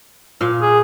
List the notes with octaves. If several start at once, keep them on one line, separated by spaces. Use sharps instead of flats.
A#2 F5
G#4